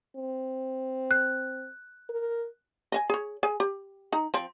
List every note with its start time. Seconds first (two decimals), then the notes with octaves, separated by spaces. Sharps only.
0.16 C4
1.11 F#6
2.09 A#4
2.92 D#5 E5 G#5
3.10 G#4 C#5
3.43 G#4 G#5
3.60 G4
4.12 D#4 A#5
4.34 F3 C4